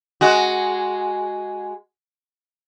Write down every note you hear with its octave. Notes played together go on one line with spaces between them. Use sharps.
G#3 F#4